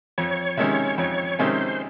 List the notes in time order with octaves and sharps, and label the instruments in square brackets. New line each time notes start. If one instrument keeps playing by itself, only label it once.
[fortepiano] F2 [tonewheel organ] C#5
[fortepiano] C3 D#3 G#3 C#4
[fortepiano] F2 [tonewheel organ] C#5
[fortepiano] C3 D#3 G#3 C#4 [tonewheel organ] C5